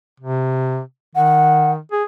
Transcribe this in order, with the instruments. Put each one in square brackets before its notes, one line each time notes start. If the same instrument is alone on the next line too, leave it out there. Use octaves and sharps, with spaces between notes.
[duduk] C3
[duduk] D#3 [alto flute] F#5
[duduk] G#4